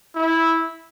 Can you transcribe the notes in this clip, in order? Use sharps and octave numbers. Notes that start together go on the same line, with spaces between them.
E4